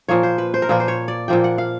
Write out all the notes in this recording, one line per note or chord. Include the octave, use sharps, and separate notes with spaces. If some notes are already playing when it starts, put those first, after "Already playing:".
A#2 F3 A#3 C#5
C5
B4
C5
A#4
A#2 F3 A#3 B4
C5
C#5
D5
A#2 F3 A#3 G5
F#5
F5